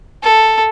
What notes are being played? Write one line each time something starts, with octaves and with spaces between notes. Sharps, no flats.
A4